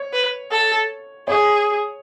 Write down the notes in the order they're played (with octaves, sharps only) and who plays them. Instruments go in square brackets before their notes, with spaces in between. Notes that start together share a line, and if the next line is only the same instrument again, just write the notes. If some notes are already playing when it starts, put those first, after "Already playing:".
Already playing: [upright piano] C#5
[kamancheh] B4
A4
[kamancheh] G#4 [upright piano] C#5